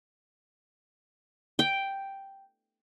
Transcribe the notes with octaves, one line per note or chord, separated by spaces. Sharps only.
G5